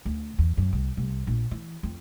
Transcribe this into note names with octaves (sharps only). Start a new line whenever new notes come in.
D2
E2
F#2
C2
C2
A#1
E3
F2